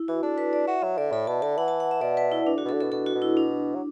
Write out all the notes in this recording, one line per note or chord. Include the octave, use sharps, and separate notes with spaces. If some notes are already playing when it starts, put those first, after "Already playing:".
Already playing: E4
E3 F#4
D4 A4
B4
D5
F#4 E5
F#3 E5
D3 D5
A2 B5
B2 A5
D3 A5
E3 F#5
A5
F#5
E5
B2 D5
B4
E4
B2 D4
D3 F#4
B2 A4
D3
B2 A4
B2 A4
F#4
B2
E4
D4
F#3